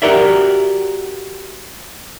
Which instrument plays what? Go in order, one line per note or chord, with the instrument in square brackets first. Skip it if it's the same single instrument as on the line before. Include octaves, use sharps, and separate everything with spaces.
[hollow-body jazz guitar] F#4 G4 A#4 D5 E5